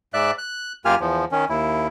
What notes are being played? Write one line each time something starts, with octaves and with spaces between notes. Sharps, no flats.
G#2 D5 E5 F#6
F#6
F#2 A#3 F4 G4 G#5 F6
E2 F3
D#3 C#4
D#2 E4